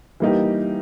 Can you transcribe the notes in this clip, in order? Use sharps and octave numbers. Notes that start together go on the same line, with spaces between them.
E3 G3 A#3 D#4 G4